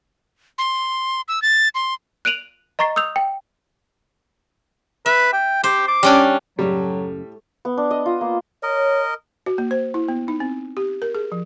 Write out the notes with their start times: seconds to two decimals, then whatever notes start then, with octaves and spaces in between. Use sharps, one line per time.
0.58 C6
1.28 E6
1.42 A6
1.75 C6
2.25 F#6 D7 D#7 F7 F#7
2.79 D#5 A#5 C#6 A6 C7
2.96 D#6 E6 G6 F7
3.16 G5
5.06 B4 E5
5.33 G5
5.64 G4 C5
5.88 D6
6.03 G3 C#4 D4
6.59 F#2 A2 C#3 F#3 G3 G4 A4
7.65 B3
7.77 D4
7.91 D#5
8.06 F4
8.21 A#3
8.63 A#4 C#5 D#5
9.46 F#4
9.58 A#3
9.71 C5
9.94 E4
10.08 B3
10.28 D#4
10.40 C4
10.77 G4
11.02 A#4
11.15 G#4
11.32 F3